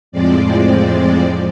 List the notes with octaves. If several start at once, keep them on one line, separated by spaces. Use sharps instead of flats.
F2 A2 F3 G#3 C4 D5